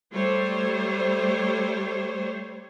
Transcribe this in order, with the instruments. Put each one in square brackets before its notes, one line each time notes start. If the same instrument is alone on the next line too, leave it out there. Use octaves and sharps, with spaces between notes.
[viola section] G3 A3 C5 C#5